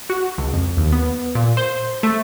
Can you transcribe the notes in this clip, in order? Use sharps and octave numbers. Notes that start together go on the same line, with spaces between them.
F#4
C#2
F2
D#2
B3
A#2
C5
A3